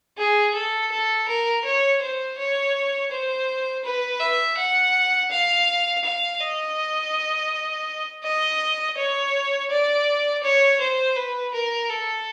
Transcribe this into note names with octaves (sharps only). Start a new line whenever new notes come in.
G#4
A4
A4
A#4
C#5
C5
C#5
C5
B4
E5
F#5
F5
F5
D#5
D#5
C#5
D5
C#5
C5
B4
A#4
A4